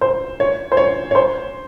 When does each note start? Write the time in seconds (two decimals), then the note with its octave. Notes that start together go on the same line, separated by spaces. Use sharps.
0.01 C5
0.40 C#5
0.72 C5
0.77 C#5
1.11 C#5
1.15 C5